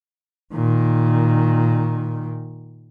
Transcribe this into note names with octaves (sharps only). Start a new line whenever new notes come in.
A#2 D#3